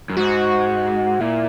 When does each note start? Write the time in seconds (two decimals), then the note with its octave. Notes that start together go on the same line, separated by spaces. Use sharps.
0.10 F#2
0.17 G#2 F#4
1.20 A#2 E4